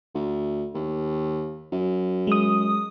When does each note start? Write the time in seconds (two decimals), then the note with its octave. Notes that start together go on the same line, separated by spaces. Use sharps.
0.14 D2
0.74 D#2
1.72 F#2
2.27 G#3 D#6